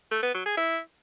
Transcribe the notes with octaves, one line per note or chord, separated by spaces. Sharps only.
A3
B3
F#3
G#4
E4